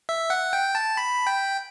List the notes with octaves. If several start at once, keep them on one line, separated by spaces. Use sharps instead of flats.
E5
F#5
G5
A5
B5
G5